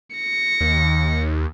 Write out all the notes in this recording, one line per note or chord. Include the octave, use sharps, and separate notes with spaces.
A#6 C#7
D#2